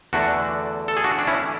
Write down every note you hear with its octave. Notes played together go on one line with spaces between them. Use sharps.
E2 D3 A3 D4 F#4
A4
G#4
D4 F#4
D4
C#4 E4